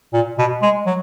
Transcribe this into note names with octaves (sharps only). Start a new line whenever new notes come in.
A#2
B2
G#3
F#3